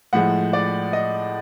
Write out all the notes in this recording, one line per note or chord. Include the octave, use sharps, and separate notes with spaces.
A2 F3 G#3 F#5
D5
D#5